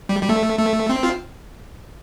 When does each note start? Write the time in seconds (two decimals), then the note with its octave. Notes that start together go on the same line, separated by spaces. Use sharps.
0.09 G3
0.22 G3
0.29 A3
0.59 A3
0.89 C4
1.03 F4